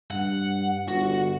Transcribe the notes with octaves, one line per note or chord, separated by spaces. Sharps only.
G2 F#5
G1 F#4